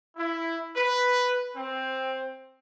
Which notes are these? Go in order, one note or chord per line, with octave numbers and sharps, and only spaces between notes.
E4
B4
C4